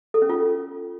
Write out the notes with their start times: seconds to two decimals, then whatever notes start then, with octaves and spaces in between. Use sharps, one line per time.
0.14 A4
0.22 C#4
0.30 F4